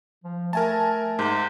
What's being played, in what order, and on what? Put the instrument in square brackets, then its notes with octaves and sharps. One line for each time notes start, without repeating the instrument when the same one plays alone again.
[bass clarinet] F3
[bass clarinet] A3 [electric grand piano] A#4 G#5 A5
[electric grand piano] G#2 [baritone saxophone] C3